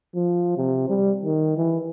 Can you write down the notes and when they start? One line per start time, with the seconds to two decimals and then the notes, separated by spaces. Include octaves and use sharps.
0.15 F3
0.57 C3
0.89 G3
1.23 D#3
1.57 E3